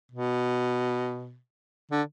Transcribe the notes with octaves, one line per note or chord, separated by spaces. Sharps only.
B2
D3